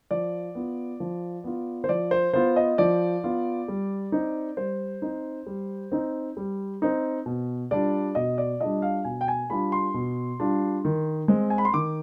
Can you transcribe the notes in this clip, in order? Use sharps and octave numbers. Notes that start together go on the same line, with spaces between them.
F3 D5
B3 F4
F3
B3 F4
C5
F3 D5
C5
B3 F4 C5
D#5
F3 D5
B3 F4
G3
C4 D#4
G3 C5
C4 D#4
G3
C4 D#4
G3
C4 D#4
B2
G3 D4 F4 D5
B2 D#5
D5
G3 D4 F4 D#5
F5
B2 G#5
G5
G#5
G3 D4 F4 B5
C6
B2
G3 D4 F4
D#3
G#3 C4
G#5
B5
C6
D#3 D6